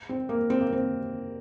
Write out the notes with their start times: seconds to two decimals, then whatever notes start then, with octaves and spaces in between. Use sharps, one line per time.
0.09 C4
0.29 A#3
0.50 C4
0.61 A#3
0.73 C4